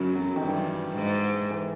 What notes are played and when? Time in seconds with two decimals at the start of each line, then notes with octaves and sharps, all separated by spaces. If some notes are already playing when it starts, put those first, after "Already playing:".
Already playing: F#2 C#3
0.15 F#3
0.36 D#3
0.42 G2 E3
0.96 G#2
1.51 E3